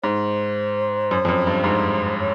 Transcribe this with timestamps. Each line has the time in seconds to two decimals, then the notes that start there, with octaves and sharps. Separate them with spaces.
0.03 G#2 C5 C#5
1.11 F#2
1.25 F2
1.28 F#2
1.47 G2
1.64 G#2
2.19 C#5